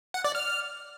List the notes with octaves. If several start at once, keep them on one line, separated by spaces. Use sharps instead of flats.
F#5
D5
F6